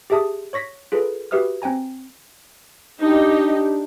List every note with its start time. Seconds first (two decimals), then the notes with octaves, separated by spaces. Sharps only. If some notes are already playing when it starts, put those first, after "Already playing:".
0.10 G4 G#4 E5 A5 D#6
0.53 C#5 C#6 A#6 B6
0.92 F4 G#4 A4 B4
1.31 F#4 G4 B4 E5 D#6 F6
1.62 C4 G5 G#5 A#5
3.01 D4 D#4 G4